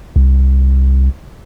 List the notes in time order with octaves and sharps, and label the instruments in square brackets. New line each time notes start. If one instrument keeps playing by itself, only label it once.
[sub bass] C2